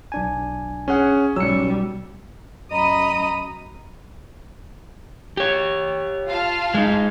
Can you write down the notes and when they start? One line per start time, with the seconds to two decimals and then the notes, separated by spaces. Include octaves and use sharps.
0.12 B1 D4 G#5
0.88 C#4 G#4 F#5
1.36 B1 F#3 G3 C#4 E6 C#7
2.71 F#2 D#5 A#5 B5 D#6
5.37 G4 C#5
6.28 F4 F5 A5
6.74 G#3 D#4